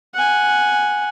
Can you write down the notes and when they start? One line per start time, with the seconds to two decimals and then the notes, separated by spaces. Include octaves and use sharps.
0.14 F#5 G#5